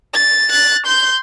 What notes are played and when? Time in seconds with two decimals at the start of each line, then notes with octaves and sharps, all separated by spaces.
0.14 A6
0.50 F#6 A6
0.86 C6 G6